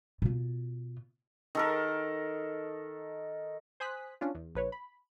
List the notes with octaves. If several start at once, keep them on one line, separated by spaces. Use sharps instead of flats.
B2 F4
D#3 A4 A#4
C5 G#5 D#6 F#6 B6
C#4 D4 F4
E2
A#1 B4 C#5
B5